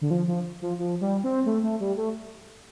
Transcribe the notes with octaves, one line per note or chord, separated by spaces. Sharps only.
D3
F3
F3
F3
F3
G3
C4
A3
A3
G3
A3